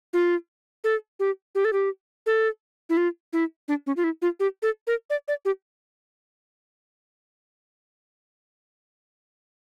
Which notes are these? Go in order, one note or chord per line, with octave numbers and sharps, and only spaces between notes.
F4
A4
G4
G4
A4
G4
A4
E4
F4
E4
D4
C#4
F4
E4
F4
G4
A4
A#4
D5
D5
G4